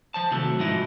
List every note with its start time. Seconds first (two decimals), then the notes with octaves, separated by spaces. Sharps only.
0.14 F3 C5 A5
0.31 C3 D#3 F#3 A3
0.59 G#2 F3 F#3 D#4 E4